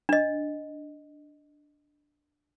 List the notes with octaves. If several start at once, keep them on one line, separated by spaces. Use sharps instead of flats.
D4 D#5